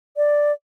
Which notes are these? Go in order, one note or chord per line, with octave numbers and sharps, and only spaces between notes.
D5